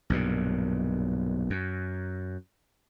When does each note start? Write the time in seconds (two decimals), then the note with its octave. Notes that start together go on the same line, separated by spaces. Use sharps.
0.10 B1 G2 A#2
1.50 F#2